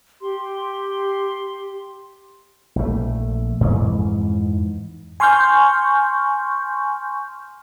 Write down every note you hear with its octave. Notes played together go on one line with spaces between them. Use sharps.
G4 C6
A#1 A3
F2 G#2 E3
G#5 C6 C#6 F6 G6